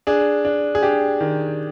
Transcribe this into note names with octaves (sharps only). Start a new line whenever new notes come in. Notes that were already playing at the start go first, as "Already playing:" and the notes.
D4 G#4
D4
G#4
D4 G4
D#3